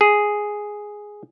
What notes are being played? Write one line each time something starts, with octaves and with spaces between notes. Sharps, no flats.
G#4